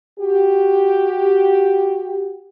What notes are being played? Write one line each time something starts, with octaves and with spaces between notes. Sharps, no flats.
F#4 G4